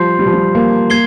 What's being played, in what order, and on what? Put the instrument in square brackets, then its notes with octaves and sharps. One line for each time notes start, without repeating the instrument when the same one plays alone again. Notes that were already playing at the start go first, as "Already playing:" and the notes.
Already playing: [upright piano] F3 G3 [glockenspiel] C6 G6 C7
[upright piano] G3
F3
G3
A#3
[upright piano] A#3 [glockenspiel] G#6 C7 G7